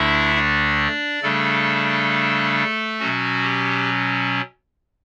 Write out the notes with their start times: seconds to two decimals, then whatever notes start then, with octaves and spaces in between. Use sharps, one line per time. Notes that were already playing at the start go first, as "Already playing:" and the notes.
Already playing: D2 D3 A3 D4 E4 E5
0.34 D4 D5
1.22 C#3 G3 A3 D4 A4
3.00 B2 F#3 C#4 F#4
3.43 G4